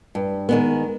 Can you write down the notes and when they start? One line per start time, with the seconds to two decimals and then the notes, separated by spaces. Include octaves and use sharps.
0.15 G2
0.49 D#3 G#3 B3